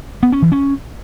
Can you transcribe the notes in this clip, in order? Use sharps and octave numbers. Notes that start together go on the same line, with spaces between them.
B3
C#4
E3
C#4